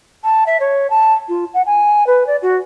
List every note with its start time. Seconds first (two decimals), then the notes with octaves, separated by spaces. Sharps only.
0.24 A5
0.47 E5
0.60 C#5
0.90 A5
1.29 F4
1.54 F#5
1.66 G#5
2.07 B4
2.27 D5
2.42 F#4